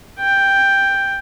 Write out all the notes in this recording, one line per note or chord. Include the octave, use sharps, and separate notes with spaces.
G5